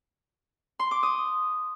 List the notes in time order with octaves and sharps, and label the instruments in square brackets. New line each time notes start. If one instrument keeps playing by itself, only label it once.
[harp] C6
D6
D#6